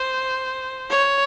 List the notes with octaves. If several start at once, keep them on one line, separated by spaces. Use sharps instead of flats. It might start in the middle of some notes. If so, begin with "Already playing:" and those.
Already playing: C5
C#5